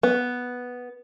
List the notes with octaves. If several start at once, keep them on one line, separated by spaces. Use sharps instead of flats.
B3